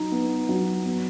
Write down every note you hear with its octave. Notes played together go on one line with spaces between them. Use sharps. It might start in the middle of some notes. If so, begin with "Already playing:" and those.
Already playing: F#3 D#4
B3
F#3
B3